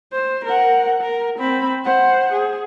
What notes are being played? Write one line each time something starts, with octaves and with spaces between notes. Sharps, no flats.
C5
A#4 F#5
A#4
C4 B5
C5 F#5
G#4